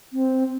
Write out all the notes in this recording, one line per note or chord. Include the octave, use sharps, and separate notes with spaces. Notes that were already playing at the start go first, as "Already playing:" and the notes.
C4